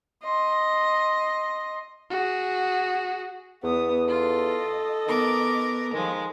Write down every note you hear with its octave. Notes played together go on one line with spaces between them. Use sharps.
D#5 C6
F#4 G#4
E2 B3 D#6
F4 A4 D#5
D#3 B3 A#4 D6
D#3 F3 G#3